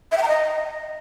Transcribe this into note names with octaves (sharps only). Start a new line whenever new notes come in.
E5
G5
A#5
D#5